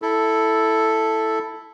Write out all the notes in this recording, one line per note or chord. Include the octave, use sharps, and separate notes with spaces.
E4 A4